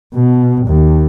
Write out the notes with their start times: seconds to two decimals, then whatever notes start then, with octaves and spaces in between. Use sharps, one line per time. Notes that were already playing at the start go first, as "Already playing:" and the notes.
0.14 B2
0.67 D#2